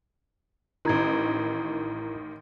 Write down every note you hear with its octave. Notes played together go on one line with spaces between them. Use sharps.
A1 D#3 E4 A#5 G#6